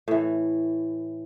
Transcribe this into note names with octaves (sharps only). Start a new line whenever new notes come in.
A2 E3